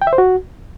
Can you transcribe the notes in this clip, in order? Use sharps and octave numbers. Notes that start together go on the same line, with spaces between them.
G5
E5
C5
F#4